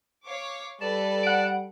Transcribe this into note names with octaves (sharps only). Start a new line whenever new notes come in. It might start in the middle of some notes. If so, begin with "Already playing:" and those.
C#5 F5 D6
G3 A4 B4 D5 A5
F#5 D7